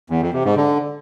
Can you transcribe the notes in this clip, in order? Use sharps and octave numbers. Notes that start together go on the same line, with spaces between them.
E2
F2
C3
G#2
D3